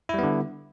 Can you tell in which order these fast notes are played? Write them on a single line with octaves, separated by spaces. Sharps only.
E4 G3 B3 D3